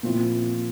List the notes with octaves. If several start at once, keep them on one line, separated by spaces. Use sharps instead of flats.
A#2 F3 C4 E4